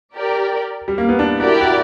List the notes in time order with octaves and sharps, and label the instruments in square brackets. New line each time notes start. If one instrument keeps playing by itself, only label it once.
[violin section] G4 A#4 D5
[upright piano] G3
A#3
B3
D4
[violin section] E4 G4 A#4 D5 [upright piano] F#4
[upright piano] F#4